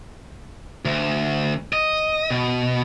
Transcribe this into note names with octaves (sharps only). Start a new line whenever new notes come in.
D2
D#5
B2